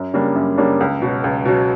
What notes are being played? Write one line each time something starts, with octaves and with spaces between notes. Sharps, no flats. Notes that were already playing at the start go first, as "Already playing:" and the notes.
Already playing: F#2
C#3 G3 A#3 D4
F#2
C#3 G3 A#3 D4
C#2
B2 F#3
C#2
B2 F#3